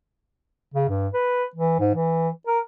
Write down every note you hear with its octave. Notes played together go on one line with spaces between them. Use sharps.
C#3
G2
B4
E3
G#2
E3
A#4